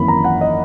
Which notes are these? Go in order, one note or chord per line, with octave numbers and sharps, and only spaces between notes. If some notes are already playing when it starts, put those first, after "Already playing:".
Already playing: G#1 F#2 E3 A#3 B5
A#5
F#5
D#5